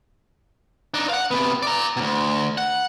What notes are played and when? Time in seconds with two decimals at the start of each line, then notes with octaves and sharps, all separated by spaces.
0.94 D4 D#4
1.10 F5 F#5
1.31 C3 B3
1.63 D5 A#5
1.97 D2 B2
2.58 F#5